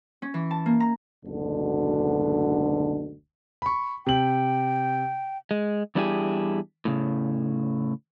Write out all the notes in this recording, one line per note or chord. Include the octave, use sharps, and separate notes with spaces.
C#4
E3
A5
A#3
A#5
F#1 D2 G#2 B2 D3
B5 C#6
C3 G5 F#7
G#3
E2 G3 D4 E4 G4 G#4
A2 C#3